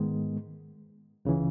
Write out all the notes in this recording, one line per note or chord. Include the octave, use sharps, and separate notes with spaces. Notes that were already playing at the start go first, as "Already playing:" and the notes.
Already playing: G#2 D#3 G#3 B3
C#2 C#3 E3